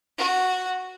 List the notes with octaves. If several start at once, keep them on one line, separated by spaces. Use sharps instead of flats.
F#4